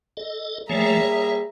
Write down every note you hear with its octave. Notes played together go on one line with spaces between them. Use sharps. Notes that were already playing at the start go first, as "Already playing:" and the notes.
A4 D#5
F3 G3 A3 A#3 G#4 C#5 E5 A#5
C#5